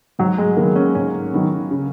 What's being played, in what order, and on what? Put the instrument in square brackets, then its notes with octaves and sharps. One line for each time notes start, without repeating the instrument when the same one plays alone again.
[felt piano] G#2 [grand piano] F#3
[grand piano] G#3
[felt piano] D#3 F#3 B3 [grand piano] A#3
[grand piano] C#4
[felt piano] G#2 [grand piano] C#4
[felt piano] D#3 F#3 B3
C#3